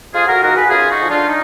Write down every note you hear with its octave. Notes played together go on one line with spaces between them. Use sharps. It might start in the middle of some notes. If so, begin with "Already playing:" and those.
F2 F4 G#4
F#4 A#4
D#3 F#4 A#4
G#4 B4
F#2 F4 G#4
D#4 F#4
D3 F3
D4 F4
D#4